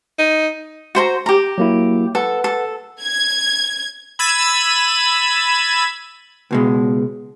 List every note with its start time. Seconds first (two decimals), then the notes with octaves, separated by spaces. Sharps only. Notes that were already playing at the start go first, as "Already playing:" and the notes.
0.19 D#4
0.95 F#4 C5 A#5
1.26 G4 A#5
1.58 F#3 A#3 E4
2.15 A4 B4 F#5
2.44 A4
3.02 G#6
4.19 B5 E6 G#6 A6 D#7 E7
6.51 C#2 B2 G#3